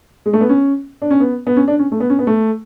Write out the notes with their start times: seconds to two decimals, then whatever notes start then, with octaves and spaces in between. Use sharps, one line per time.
0.26 G#3
0.33 A3
0.41 B3
0.49 C#4
1.02 D4
1.11 C#4
1.20 B3
1.47 B3
1.57 C#4
1.68 D4
1.79 C#4
1.92 A3
2.00 B3
2.10 C#4
2.19 B3
2.27 A3